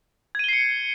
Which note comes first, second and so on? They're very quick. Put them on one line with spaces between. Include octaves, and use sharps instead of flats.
G#6 D#7 G7 C7 C#7